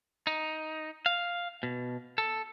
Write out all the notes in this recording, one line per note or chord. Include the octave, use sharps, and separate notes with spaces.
D#4
F5
B2
A4